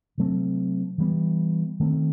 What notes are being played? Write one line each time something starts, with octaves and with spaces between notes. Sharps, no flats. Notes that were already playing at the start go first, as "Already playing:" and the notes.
C3 F#3 A3 C4
E3 G3 B3
D#3 A3 C4